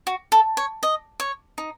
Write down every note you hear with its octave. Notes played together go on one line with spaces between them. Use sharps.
F#4
A4
C#5
D#5
C#5
D#4